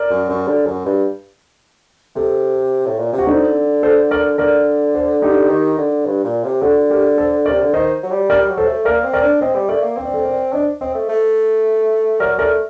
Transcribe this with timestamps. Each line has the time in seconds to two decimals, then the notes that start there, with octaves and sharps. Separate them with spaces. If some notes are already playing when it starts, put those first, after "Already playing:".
Already playing: A#4 D5
0.11 F#2
0.29 F#2
0.48 D3
0.66 F#2
0.85 G2
2.15 C3 A4 C5
2.86 A2
2.99 A#2
3.13 C3
3.18 F#4
3.27 D3 C4 D#4
3.83 A4 C5
4.11 A#4 D5
4.38 D3 A#4 D5
4.95 A4 C5
5.22 D#4 G4
5.50 D#3
5.78 D3
6.06 G2
6.24 A#2
6.44 C3
6.62 D3 F#4 A4
6.90 G4 A#4
7.18 A4 C5
7.46 A#4 D5
7.50 C3
7.62 D3
7.74 D#3 C5 D#5
8.03 F#3
8.11 G3
8.30 G3 A#4 D5
8.40 G3
8.49 F#3
8.57 A4 C5
8.67 A3
8.85 A#3 A#4 D5
9.04 C4
9.13 A#4 D5
9.22 D4
9.41 C4 C5 D#5
9.56 G3
9.69 A3 A#4 D5
9.83 A#3
9.97 C4 C5
10.05 D5
10.13 A4 C5
10.25 A#4 D5
10.52 D4 C5 D#5
10.81 C4 C5 D#5
10.95 A3
11.09 A3
12.20 F#3 A#4 D5
12.39 A3 A#4 D5